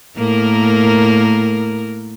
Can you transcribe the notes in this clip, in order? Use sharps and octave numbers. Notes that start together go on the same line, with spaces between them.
A2 A#3 A#4